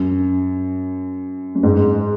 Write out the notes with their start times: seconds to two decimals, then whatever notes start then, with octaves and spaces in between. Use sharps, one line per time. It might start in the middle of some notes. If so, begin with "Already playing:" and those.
Already playing: F#2
1.55 F#2
1.63 G#2